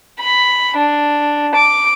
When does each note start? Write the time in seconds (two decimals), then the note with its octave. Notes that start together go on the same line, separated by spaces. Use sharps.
0.20 B5
0.77 D4
1.55 D6